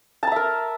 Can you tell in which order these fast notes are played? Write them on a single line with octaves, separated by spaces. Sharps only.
A5 A#5 E5 A#4